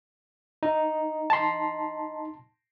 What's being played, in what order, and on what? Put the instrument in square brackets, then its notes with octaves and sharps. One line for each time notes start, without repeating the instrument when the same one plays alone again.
[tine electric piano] D#4
[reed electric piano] A5 C6